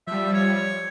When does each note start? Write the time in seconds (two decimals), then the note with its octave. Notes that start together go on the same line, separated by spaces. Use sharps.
0.07 F3 G3 E5
0.33 C#5